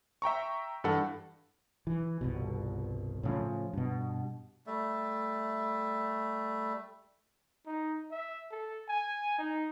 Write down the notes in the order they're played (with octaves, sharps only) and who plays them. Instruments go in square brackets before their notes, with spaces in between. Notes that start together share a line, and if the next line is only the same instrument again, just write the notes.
[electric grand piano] E5 G5 A#5 C#6
G2 E3 A4 F#5
[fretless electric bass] E3
G1 C2 B2
A2 C#3 F3
G2 B2
[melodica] G3 A3 E5
[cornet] D#4
E5
A4
G#5
D#4